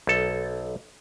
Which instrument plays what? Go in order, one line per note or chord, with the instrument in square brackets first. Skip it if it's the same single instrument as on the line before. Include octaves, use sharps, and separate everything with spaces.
[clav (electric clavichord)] B1 A4